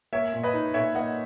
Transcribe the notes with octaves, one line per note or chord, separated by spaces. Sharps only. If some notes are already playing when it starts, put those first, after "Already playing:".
A#3 C#5 E5
A#2
B4 D#5
D#4
A#2 C#5 E5
A#3 D#5 F#5